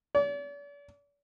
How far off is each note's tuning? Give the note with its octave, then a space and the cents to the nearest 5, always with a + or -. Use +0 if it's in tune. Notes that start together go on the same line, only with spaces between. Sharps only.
D5 -45